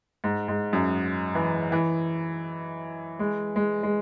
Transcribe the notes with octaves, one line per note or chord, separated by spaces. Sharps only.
G#2
G#2
F#2
E3
E3
G#3
G#3
G#3